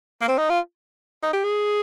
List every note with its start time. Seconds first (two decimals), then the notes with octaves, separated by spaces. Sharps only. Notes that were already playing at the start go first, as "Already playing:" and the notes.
0.21 A#3
0.28 C4
0.38 D#4
0.50 F4
1.23 D#4
1.33 G4
1.44 G#4